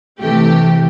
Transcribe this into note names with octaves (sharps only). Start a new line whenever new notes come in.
C3 E3 A3 G4